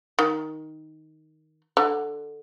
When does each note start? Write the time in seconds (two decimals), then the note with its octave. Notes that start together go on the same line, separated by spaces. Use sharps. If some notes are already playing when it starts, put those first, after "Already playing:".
0.19 D#3
1.77 D3